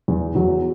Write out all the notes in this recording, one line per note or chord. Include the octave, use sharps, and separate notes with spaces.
E2
E2 F#3